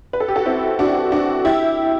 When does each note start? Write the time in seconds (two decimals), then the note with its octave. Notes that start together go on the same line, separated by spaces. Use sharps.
0.13 B4
0.20 A4
0.28 G4
0.36 F#4 A4
0.46 C4 E4
0.79 D4 F#4
1.12 D4 F#4
1.45 E4 G4